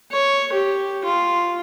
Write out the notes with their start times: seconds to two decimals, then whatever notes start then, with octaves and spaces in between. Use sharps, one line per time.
0.12 C#5
0.53 G4
1.05 F4